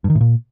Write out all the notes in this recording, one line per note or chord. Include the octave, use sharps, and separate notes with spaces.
G2
D#3
A2
A#2